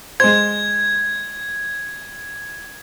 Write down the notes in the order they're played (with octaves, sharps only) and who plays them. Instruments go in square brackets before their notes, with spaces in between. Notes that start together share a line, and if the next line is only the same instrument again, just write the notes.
[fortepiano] G#3 C5 [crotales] G#6